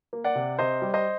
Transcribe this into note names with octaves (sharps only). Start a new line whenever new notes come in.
A#3
D5 F#5
C3
C3 C5 D#5
G3
C5 D#5